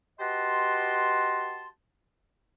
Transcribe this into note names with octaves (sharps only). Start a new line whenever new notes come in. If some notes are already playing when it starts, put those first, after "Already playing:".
F#4 G4 B4 D#5 A5 C6